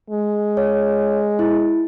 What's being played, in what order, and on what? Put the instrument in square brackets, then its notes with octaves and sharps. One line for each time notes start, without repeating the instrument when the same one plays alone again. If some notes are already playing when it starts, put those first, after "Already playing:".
[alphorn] G#3
[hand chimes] C#5
E4